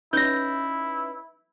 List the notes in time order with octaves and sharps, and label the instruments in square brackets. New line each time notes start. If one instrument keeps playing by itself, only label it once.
[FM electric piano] C#4 D#4 B4 [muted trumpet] E4 [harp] G6 A#6